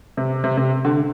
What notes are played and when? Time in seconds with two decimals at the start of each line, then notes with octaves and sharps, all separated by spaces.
0.17 C3
0.44 C3
0.57 C3
0.85 D3